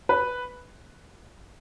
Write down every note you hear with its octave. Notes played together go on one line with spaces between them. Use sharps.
B4